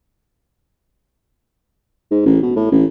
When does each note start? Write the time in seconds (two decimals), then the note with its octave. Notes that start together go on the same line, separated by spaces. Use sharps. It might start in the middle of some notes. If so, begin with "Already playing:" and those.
2.11 G#2
2.26 A1
2.42 B2
2.56 A2
2.72 A1